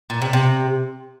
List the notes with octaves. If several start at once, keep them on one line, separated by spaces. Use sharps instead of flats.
A#2
C3
C3